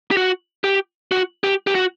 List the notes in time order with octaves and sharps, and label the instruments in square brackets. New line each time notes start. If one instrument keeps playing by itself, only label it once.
[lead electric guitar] G4
F#4
G4
F#4
G4
G4
F#4